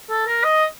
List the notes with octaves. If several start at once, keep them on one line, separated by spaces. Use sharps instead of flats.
A4
A#4
D#5